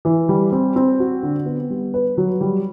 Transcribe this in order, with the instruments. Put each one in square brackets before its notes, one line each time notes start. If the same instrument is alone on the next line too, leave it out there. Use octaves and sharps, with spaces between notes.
[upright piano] E3
G3
C4
C4
F#4
D3
B3
G3
B4
F#3
G3